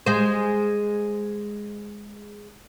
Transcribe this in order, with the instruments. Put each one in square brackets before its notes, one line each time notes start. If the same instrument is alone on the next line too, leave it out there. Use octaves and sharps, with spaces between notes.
[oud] G#3 C5